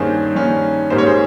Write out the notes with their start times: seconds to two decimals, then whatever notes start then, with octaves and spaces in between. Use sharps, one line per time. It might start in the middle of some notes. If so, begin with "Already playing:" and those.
Already playing: G2 D#3 A#3 C#4 G#4 C5
0.35 G2 D#3 A#3 C#4
0.90 G#2 G3 A#3 C5
0.98 C#5
1.07 G#4 C5